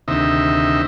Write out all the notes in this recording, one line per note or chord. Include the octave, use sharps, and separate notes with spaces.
D2 C3 D#3 D#4 E5